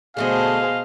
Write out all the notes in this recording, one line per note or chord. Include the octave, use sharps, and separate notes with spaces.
B2 D3 A3 F#4 G#4 C5 D#5 F5